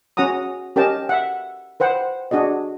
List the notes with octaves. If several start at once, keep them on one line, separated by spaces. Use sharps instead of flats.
C#4 F#4 F#5 A#5 D#6
C#4 G4 A#4 D#5 G5 A5
E5 F#5
B4 C5 F#5 G5
D4 F#4 G#4 D#5